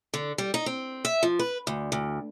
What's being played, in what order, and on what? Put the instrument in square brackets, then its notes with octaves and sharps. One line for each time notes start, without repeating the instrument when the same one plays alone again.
[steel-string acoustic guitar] D3
G3
D#4
C4
E5
F3
B4
D2
D2